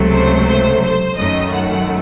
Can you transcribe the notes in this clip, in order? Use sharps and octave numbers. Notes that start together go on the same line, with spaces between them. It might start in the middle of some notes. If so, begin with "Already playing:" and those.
Already playing: C#2 C3 F#3 A3
C5
C5
C5
F#2 D#3 A3 D#5
F#5